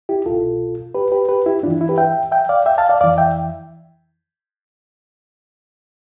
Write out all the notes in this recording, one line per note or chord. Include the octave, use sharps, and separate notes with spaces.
E4 G4
C2 B2 F4 A4
G4 B4
G4 B4
G4 B4
E4 G4
G2 E3 D4 E4 F4
E4
G4 B4
E5 G5
E5 G5
D5 F5
E5 G5
F5 A5
D5 F5
F2 E3 D5 F5
E5 G5